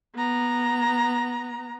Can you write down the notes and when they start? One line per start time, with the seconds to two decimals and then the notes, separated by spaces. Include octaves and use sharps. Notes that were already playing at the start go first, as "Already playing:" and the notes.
0.15 B3 A#5